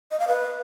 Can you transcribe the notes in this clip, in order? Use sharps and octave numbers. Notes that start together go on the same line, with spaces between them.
D#5
F5
B4